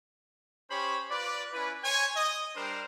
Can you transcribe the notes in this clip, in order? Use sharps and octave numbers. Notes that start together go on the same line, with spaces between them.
C#4 G4 C5 C#5 B5
F4 B4 D5
C#4 E4 B4
C5 C#5 G#5
D#5
G3 D4 A#4 C5